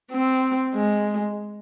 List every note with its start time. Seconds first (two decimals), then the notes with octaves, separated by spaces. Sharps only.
0.12 C4
0.74 G#3